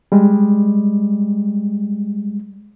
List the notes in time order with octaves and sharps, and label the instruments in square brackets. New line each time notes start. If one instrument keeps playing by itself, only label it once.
[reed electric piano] G3 G#3